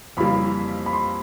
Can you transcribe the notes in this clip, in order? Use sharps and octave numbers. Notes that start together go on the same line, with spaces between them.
F2 C#3 E3 G3 A#3 B5
B5
C6